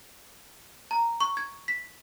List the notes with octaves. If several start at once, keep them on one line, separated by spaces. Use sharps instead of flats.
A#5
C#6
G#6
B6